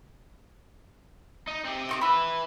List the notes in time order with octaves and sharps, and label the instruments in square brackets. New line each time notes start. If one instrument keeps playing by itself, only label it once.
[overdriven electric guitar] D#4
C4 G4
[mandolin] D#4 C#6 D6
[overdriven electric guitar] E4 B4 [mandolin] B5 E6